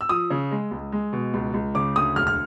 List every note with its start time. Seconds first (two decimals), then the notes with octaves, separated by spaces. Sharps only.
0.01 E6
0.09 F3 D#6
0.30 C#3
0.51 G#3
0.71 C#2
0.92 G#3
1.13 B2
1.34 C#2
1.54 C#2
1.75 C#3 D6
1.96 D2 D#6
2.16 E1 F6
2.27 F6